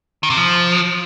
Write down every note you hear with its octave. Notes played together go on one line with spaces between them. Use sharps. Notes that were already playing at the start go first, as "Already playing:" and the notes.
D#3
C3
F3